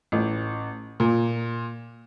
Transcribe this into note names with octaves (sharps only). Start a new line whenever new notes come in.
A1
A#2